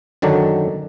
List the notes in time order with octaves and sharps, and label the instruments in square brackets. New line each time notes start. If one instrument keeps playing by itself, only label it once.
[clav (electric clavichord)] F#2 D3 D#3 F#3 D4